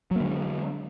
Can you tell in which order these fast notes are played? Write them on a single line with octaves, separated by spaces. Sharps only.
F#3 A#3 D3 G#3